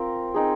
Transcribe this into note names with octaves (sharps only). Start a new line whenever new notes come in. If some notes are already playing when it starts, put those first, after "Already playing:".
Already playing: C4 F4 A#4
C4 D#4 G#4